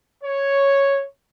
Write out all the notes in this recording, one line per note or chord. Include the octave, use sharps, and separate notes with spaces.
C#5